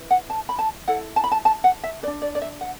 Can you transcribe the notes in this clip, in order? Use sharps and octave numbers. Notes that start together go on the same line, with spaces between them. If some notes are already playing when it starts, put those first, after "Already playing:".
Already playing: E4 B4
F#5
A5
B5
A5
E4 A4 F#5
A5
B5
A5
A5
F#5
E5
B4 D5
D4
D5
D5
E5
F#5